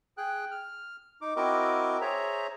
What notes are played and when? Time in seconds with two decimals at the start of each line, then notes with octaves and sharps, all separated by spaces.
0.17 G#4 G5 F#6
0.51 F6
1.21 D#4 D6
1.36 C4 E4 F#4 A#4 D#5 D6
2.01 G#4 C5 C#5 E5 A#5